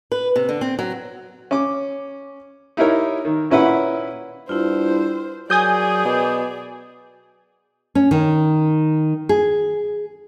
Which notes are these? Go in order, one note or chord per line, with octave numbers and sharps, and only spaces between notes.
B4
C3
D3
C4
F#3
C#4 D6
D#4 E4 G4 A#4 C#5
D#3
A#2 C#4 E4 B4 F#5
G2 E4 F4 C5
F#3 G#4 A#4 D5 G#5 D#6 G6
B2
C#4
D#3
G#4